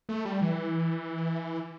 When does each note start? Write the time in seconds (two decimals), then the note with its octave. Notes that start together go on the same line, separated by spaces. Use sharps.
0.09 A3
0.25 G3
0.42 E3